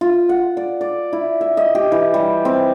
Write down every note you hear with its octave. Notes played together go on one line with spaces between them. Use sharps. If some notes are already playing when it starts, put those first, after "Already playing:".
F4
F#5
D5
D5
E4
E5
D#5
G4
E3
G3
C4